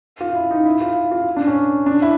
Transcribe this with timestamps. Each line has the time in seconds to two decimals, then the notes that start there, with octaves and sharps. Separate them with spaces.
0.21 F4
0.35 E4
0.51 D#4
0.66 E4
0.81 F4
1.11 F4
1.37 D4
1.47 C#4
1.86 D4
2.02 E4